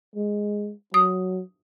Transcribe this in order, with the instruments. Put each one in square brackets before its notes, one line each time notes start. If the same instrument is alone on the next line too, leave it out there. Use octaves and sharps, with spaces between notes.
[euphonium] G#3
[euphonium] F#3 [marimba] D#6